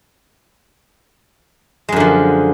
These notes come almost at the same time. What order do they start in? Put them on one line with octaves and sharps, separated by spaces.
G#3 F#2 D3 F3